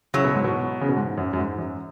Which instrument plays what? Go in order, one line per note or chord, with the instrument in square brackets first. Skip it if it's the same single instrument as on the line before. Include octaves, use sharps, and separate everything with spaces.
[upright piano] C#3 [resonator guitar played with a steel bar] F#3 E4 C#5
[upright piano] B2
G#2
B2
C#3
B2
G#2
F#2
F#2
G#2
F#2